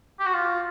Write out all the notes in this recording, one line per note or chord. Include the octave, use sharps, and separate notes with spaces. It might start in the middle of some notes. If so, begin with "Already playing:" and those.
G4
F#4
F4